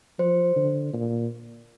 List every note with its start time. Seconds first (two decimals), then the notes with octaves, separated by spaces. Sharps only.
0.19 F3 C5
0.56 D3
0.93 A#2